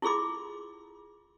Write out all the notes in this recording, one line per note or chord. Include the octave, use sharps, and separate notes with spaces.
E4 F4 G#4 C6 D6